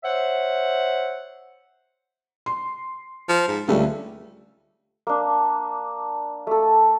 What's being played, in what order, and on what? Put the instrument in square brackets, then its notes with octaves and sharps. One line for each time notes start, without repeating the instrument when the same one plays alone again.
[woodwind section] C5 C#5 E5 F#5
[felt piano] C6
[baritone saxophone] F3
G#2
[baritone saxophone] C#2 [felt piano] D3 G3 A3
[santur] A#3 D4
A3 A4